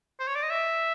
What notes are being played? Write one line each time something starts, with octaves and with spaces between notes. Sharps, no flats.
C5
C#5
D5
D#5
E5